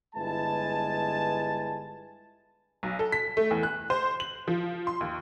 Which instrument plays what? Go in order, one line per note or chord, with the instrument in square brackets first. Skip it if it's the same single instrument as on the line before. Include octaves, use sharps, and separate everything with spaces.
[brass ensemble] G1 G#3 E4 B4 G#5 A5
[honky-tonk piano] B1
A4
B6
A3
E2
F#6
C5
F#7
F3
C6
D#2